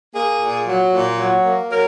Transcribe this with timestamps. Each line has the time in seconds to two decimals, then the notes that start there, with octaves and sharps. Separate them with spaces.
0.14 A#3 G#4
0.40 A#2
0.66 F#3
0.92 A#2
1.18 F#3
1.44 A#3
1.70 F#3 A#4